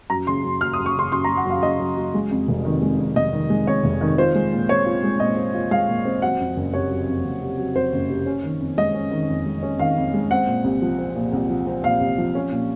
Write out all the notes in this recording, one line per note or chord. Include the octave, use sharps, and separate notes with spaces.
F#2 A#5
C#3 C6
F#2
F#3 F6
D#6
F#2
C#6
C#3 C6
F#2 C6
A#5
F#3
F#5
F#2 F5
C#3 D#5
F#2
F#3
G#3
F2
F1
D#3
G#3
F2
F1 D#5
D#3
G#3
F2 C#5
F1
D#3
F4 C5
G#3
A#2
C4 C#5
F4
G#3
A#2 D#5
C4
F4
G#3 F5
A#2
C4
F#3 F#5
F2
F#1
C3 C#5
F#3
F2
F#1
C3
F#3
F2 C5
F#1
C3
C#4
D#3
F2
G#3 D#5
C#4
D#3
F2
G#3
C#4
D#3 F5
F2
G#3
C4 F#5
A#2
C2
F3
C4
A#2
C2
F3
C4
A#2 F5
C2
F3
C#4
A#2